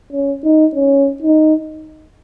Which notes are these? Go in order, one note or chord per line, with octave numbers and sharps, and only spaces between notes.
C#4
D#4
C#4
D#4